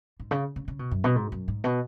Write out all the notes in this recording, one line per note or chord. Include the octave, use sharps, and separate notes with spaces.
G#2
C#3
C#3
C#3
B2
F#2
B2
G#2
F#2
G#2
B2